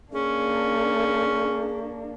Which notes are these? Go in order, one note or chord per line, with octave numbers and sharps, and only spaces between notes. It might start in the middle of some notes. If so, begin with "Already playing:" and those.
A#3 C#4 D4 G#4